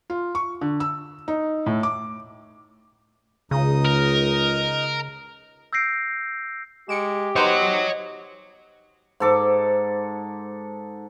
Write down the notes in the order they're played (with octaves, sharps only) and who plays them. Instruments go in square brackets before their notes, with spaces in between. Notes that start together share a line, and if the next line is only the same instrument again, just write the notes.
[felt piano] F4
C#6
D3
E6
D#4
A2
D6
[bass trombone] C#2 [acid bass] C#3 [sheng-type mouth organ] D#4 D#5 D#6
[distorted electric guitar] A#4
[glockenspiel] E6 G6 A#6 C7 D7
[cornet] G#3 [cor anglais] G4 [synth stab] C#7 D7 E7
[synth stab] B3 D#4 C5 [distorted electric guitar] C#5 F#5 [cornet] D#5
[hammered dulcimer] G#2 A4 D6